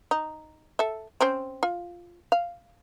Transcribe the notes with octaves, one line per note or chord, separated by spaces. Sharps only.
D#4
A4 E5
C4 C#4 C5
F4
F5